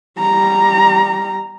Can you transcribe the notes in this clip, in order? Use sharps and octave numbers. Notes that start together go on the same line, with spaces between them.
G3 A#5